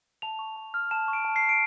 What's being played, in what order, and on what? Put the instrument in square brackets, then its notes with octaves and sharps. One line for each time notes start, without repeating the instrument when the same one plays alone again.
[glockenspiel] A5 F7
C#6
A5
F6
A5 E7
C#6
D7
A5
C7
F6
D7